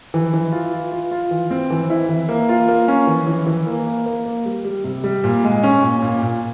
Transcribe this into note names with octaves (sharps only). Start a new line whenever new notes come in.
E3
E3
F4
F4
F4
F4
E3
C4
E3
E4
E3
A#3
F4
A#3
C#4
E3
E3
E3
A#3
A#3
A#3
A#3
G3
G3
C3
G3
A#2
G#3
C#4
A#2
A#2
A#2